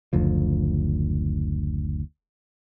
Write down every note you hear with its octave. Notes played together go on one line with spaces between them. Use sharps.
F#1 D2 F3